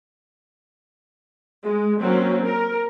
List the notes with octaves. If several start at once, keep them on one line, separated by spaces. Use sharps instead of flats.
G#3
F#3 A#3 C4 C#4
A#4